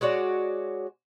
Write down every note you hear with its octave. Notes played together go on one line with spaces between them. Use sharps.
G#3 F#4 C#5 D5